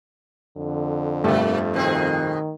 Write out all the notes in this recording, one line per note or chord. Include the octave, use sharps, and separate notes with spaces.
F2 D3
G2 B2 A3 A#3
B2 D#3 C4 G#4